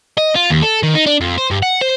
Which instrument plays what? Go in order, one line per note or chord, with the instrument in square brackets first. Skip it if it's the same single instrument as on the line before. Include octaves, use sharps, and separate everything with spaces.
[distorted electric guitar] D#5
F4
D#2
A4
D#3
D#4
D4
F2
C5
G2
F#5
C5